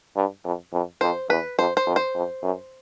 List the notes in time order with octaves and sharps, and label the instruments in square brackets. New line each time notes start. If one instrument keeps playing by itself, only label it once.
[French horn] G2
F2
F2
[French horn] F2 [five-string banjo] C5
[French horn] E2 [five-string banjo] B4
[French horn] F2 [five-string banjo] C5
[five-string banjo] C5
[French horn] F2
[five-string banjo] C5
[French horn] F2
F#2